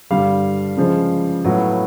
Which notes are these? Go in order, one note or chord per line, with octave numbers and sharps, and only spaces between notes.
G2 D3 G3 F5
C#3 F3 G#3
A2 F#3 B3